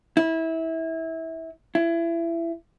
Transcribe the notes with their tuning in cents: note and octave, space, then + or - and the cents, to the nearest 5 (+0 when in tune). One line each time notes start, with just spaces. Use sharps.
E4 -20
E4 +25